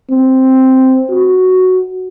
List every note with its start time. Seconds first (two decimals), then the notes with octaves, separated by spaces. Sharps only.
0.10 C4
1.10 F#4